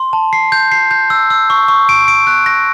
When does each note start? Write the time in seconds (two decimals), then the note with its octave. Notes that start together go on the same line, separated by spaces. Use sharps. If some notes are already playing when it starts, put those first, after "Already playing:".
Already playing: C6
0.13 A5
0.33 C7
0.52 G6
0.72 C7
0.91 G6
1.10 E6
1.30 E6
1.50 C#6
1.68 C#6
1.89 D7
2.08 D7
2.27 F#6
2.46 A#6